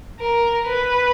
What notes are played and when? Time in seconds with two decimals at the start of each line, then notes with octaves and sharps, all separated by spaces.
0.20 A#4
0.68 B4